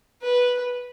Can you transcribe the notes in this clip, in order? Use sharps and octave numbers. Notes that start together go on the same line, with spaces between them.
B4